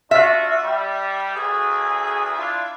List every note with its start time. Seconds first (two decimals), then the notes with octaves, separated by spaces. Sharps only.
0.11 D4 F4 F#4 E5
0.64 G3
1.35 D2 G#4
2.37 D4 E4 F4